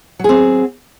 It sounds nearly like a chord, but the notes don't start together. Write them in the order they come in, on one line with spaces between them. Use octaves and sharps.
F#3 G#4 C4